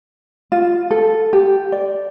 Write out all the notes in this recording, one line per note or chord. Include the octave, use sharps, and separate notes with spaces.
F4
A4
G4
D5